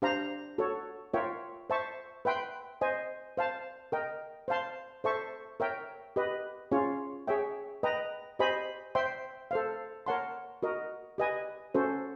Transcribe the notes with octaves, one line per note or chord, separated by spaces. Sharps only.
D4 G4 C5 F5 A#5
F#4 A4 C#5
F4 A#4 C#5 E5 G5
C5 E5 A5 C#6
B4 E5 G5 C6
C5 D#5 G#5
C5 F5 A5
A#4 D#5 G5
C5 F5 A5 C6
A4 C5 E5 A5 C#6
A#4 C#5 E5 G5
G4 B4 D#5
C#4 F4 G#4 C#5
G#4 C#5 E5 G5
B4 D#5 G5 A#5
G4 C5 D#5 G#5 B5
C5 E5 G5 C6
A4 C5 F5
A#4 C#5 F#5 A5 C6
F#4 A#4 D#5
G4 B4 D#5 G#5
C#4 F#4 A4 C5